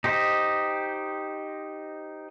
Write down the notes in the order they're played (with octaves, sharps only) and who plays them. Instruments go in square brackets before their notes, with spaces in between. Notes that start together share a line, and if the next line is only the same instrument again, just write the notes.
[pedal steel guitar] D#4 G4 C5 D#5